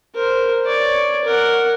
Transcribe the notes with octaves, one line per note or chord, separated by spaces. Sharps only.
A#4 C5
C#5 D5
A#4 F#5